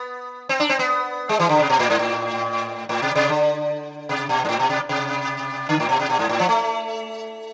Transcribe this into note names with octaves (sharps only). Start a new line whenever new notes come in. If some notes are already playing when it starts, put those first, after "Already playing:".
Already playing: B3
C4
D4
C4
B3
G#3
E3
D3
C3
B2
A2
G#2
A2
A2
C3
C3
D3
C3
B2
G#2
A2
B2
C3
C3
D3
A2
B2
C3
B2
G#2
A2
F3
A3